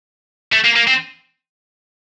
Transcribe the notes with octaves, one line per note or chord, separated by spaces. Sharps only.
A3
A#3
A#3
C4